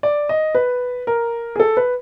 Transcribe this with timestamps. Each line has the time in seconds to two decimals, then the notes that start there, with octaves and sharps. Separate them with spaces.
0.03 D5
0.29 D#5
0.55 B4
1.07 A#4
1.56 G#4
1.60 A4
1.77 B4